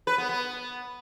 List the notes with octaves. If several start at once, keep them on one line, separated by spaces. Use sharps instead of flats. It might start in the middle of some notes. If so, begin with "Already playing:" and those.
B4
B3
B3